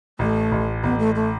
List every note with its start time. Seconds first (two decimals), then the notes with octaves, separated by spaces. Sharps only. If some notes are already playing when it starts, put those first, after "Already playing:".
0.19 A1 A3
0.52 A1
0.83 A1 B3
0.99 A3
1.15 A3